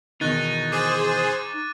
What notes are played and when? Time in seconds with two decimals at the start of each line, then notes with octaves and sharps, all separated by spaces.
0.21 E2 B2 D#3 D#4 C#6 F#6 A6
0.72 G#4 C5 D6 A6 D#7